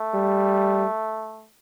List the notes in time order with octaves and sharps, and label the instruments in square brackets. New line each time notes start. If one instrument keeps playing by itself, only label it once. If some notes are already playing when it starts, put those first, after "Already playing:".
Already playing: [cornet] A3
[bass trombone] G3